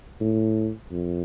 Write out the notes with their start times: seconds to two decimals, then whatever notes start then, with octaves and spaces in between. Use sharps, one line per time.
0.21 A2
0.91 F2